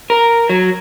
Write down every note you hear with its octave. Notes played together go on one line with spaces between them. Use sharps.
A#4
F#3